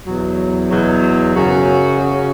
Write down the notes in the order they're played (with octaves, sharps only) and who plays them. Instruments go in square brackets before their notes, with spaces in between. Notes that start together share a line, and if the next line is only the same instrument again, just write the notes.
[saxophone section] E2 B2 F#3
E2 B2 F#3
F#2 C#3 F#3 C#4 F#4
F#2 C#3 F#3 C#4 F#4